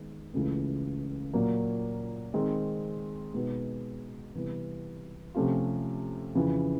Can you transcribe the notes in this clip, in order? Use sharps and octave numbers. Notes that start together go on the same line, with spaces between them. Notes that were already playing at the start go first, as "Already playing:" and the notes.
Already playing: D#3 G#3 B3 D#4
C#2 C#3 E3 A3
A#2 F#3 A#3
D#3 G#3 C4 D#4
B2 G#3 B3 D#4 F#4
C3 E3 G3 B3
C3 F3 A3 C#4 F4
F2 C#3 E3